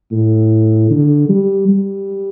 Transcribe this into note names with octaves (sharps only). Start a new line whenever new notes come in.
A2
D3
G3
G3